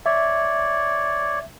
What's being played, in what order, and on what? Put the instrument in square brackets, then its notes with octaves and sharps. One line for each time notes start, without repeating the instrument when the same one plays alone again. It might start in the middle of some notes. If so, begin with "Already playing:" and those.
[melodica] C#5 D5 [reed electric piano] E5